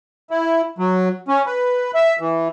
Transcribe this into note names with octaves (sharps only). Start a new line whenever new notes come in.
E4
F#3
C#4
B4
E5
E3